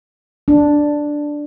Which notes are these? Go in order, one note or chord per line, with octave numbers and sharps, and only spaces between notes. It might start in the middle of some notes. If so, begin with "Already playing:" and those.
D4